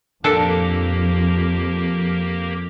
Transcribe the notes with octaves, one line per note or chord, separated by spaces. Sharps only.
F2 A#2 A#3 D4 G4 A4 A#4